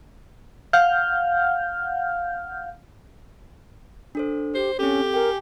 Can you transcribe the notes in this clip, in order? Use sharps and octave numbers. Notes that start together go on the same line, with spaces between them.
F5 F#5 F6 G6
D4 A4 C5
G4 C5
C4 C#4 G4 A4
A#4 G5 G#5